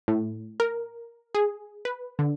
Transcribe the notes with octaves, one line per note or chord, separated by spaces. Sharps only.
A2
A#4
G#4
B4
D3